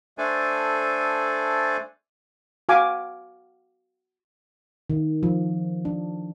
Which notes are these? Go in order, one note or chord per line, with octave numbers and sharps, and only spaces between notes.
A3 D4 A4 C5 D5 G#5
F#4 F5 G#5 D6
D#3
F3
D4